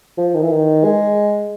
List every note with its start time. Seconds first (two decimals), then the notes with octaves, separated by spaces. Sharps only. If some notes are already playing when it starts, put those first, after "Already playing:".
0.18 F3
0.34 D#3
0.42 E3
0.51 D#3
0.84 G#3